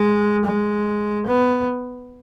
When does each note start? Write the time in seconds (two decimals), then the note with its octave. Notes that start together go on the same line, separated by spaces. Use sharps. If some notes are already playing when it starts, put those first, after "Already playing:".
Already playing: G#3
0.45 G#3
1.27 B3